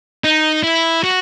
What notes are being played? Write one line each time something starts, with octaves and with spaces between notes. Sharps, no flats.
D#4
E4
F#4